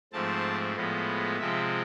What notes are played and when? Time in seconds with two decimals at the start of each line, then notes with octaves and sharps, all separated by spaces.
0.13 G#2 F3 A3 C4 A5
0.76 A2 F3 G#3 B3
1.39 C3 F3 G#3 C4 E5